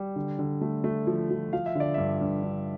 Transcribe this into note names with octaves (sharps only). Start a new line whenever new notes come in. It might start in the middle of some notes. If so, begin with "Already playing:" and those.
Already playing: G3
D3
D3
A3
A3
F3
F3
F3 F5
E5
D3 D5
G2 E5
G2
D3